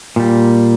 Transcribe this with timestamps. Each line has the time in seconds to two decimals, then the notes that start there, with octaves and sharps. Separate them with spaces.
0.16 A#2 G3